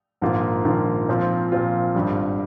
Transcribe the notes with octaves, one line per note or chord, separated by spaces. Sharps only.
A#1 G#2 D#3 A#3 F4
A#1 G#2 D#3 A#3 F4
A#2 F3 C4 F4
A#2 F3 C4 F4
G#1 G2 G3